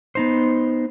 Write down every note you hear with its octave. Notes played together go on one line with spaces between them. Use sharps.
B3 D#4 C5